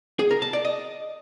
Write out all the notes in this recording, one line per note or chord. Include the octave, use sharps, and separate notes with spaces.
G#4
A#4
A5
D5
D#5